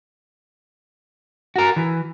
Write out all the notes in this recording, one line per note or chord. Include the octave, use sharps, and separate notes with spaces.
F#4 A#4
E3